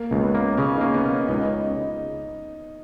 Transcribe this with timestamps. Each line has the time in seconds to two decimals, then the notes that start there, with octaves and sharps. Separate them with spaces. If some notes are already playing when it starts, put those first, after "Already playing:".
Already playing: A#3
0.11 C#2
0.23 B3
0.35 A#3
0.57 C#3 C#4
0.76 D#4
0.81 A#3
0.94 B3
1.05 A#3
1.11 C#4
1.29 C#2 D#4